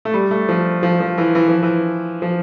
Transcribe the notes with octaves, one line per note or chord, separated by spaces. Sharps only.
A3
G3
A3
F3
F3
F3
E3
E3
F3
E3
F3